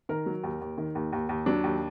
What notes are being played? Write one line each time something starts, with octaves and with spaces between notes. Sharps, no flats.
D#3 A#4
F#3
D#2
D#2
D#3
D#2
D#2
D#2
F#3 D4
D#2